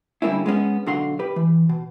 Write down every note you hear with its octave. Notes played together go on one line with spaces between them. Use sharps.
D3 G3 A3 A#3 C#4 E4
G#3 B3 C#4
B1 D3 F#4 F5 F#5 C6
G4 B4
E3
B2